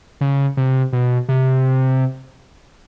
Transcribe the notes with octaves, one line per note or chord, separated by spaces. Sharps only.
C#3
C3
B2
C3